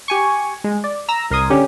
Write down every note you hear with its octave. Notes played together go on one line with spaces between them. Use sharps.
G4 G#5 C#6
G#3
D5
A#5 E6 A#6
C2 A#4 C6 D#6 G#6
D3 C#4 G4